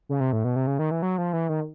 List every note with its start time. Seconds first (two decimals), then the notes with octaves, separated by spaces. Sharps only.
0.09 C#3
0.20 C3
0.33 A2
0.44 B2
0.56 C3
0.67 C#3
0.79 D#3
0.91 E3
1.02 F#3
1.18 F3
1.33 E3
1.49 D#3